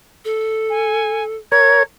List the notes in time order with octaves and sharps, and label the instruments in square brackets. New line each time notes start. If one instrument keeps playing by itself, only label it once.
[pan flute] A4
[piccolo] G#5
[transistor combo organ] A#4 C#5 [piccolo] G#6